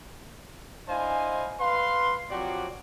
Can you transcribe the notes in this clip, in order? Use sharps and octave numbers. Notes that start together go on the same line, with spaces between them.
D4 E4 C5 D#5 F5 G#5
B4 F5 C6
F3 F#3 C4 F#4 G4 D5